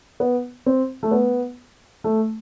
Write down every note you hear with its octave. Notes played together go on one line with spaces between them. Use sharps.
B3
C4
A3
B3
A3